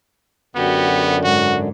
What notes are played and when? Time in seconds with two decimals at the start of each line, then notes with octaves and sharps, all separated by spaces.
0.55 F#2 D3 B3 F#4 G4
1.24 G#2 F#4